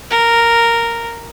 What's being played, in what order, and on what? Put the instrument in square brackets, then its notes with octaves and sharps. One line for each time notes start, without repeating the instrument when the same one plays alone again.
[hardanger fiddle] A#4